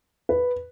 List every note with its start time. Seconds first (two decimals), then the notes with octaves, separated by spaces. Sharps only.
0.29 B4